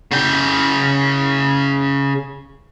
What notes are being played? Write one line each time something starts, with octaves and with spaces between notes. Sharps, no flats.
C#3 G5